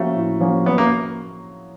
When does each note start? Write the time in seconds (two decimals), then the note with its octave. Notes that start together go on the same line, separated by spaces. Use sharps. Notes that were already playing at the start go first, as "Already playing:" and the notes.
Already playing: F3 A3 A#3 C#4 F#4
0.16 A2
0.40 F3 A#3 C#4 F#4
0.66 F#3 B3
0.78 A#3